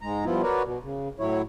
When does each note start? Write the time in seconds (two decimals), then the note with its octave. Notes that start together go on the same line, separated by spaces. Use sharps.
0.01 G#2 G#3 A#5
0.25 G2 F3 B3 E4 F4
0.43 F#4 A#4 B4 C#5 D5
0.63 B2
0.83 C#3
1.19 A2 F#3 E4 C#5